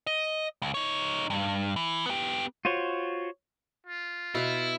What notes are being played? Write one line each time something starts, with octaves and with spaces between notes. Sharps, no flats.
D#5
C#2
D#4 C#5
G2
E3
B3 G4
F4 F#4 C5 C#5
F4
B2 E4 F5